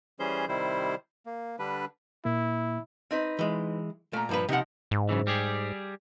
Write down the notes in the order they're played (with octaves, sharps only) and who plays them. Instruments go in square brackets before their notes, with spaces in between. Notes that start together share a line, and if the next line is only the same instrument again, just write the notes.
[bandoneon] E3 G3 C#4 G#4 C5 G6
C3 D#3 G3 E4 C5
A#3
D3 G3 D4 B4
[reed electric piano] A#2 A#3 [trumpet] E4
[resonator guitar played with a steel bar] C4 D#4 B4
[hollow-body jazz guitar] E3 G#3
[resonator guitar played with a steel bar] A#2 A#5 [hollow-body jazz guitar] A3
[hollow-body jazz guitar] G2 F3 B4
[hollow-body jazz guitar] C3 F#5 [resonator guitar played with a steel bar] F3 D#4
[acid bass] G#2
[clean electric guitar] F#2 C#3 E3
G3 G4 G#4